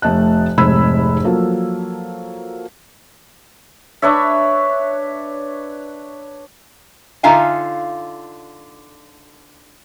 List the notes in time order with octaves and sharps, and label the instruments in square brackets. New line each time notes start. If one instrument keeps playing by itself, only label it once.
[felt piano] F1 A3 D#5 A5 F#6
F1 G#2 C3 B5 E6 G#6
F3 F#3 A#3 A4
[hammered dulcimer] D4 B4 C#5 E5
[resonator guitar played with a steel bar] D3 D#4 F4 E5 F5 G#5